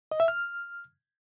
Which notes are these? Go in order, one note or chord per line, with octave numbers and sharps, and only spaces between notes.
D#5
E5
F6